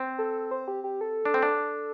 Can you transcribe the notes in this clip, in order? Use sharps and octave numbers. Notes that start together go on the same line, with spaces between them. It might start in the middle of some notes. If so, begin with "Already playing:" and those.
Already playing: C4
A4
C5
G4
G4
A4
D4
C4
D4